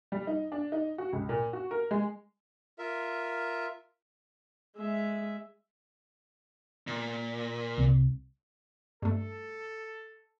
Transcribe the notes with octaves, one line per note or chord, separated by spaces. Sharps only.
G3
D#4
D4
D#4
F#4
C#2
A#2
F#4
A#4
G#3
F4 A#4 E5
G#3 E5
A#2
C2
G2 A3 A4